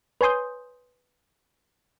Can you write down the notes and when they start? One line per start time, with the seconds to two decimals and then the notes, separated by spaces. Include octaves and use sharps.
0.21 B4 C#5 G#5 C6 D#6 G6